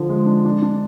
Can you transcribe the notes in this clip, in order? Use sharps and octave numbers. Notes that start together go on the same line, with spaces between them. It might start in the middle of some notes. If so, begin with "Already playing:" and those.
Already playing: D3 F3
G#3
D4
D4
D4